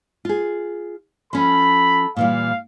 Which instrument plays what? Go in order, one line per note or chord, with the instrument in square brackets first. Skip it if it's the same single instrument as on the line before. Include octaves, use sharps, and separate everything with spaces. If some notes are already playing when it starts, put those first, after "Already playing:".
[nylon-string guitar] F4 G#4
[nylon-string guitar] F3 C#4 [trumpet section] A4 B5
[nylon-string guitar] A#2 E3 G3 [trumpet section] F5